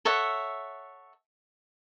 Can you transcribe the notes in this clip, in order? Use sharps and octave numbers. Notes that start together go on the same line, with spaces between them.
A4 C#5 E5 F#5